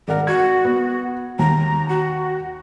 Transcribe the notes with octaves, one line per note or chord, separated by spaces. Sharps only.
G#1 A#4 D5 F#5
F#4 G#6
B3
D#2 A#5
F#4